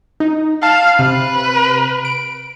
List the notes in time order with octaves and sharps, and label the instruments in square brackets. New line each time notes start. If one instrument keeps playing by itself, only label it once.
[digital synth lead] D#4
[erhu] F5 [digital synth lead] A5
[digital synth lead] C3 [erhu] B4
[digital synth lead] D7